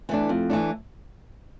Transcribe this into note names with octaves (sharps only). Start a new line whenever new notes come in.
E3 A3 D4
F2
E3 A3 D4